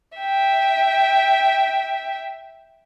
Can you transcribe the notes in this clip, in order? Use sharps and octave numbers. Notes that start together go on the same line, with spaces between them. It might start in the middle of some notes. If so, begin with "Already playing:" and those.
E5 G5